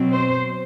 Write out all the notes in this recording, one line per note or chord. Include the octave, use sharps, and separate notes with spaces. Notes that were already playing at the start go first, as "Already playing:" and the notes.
Already playing: B2 F#3 C4
C5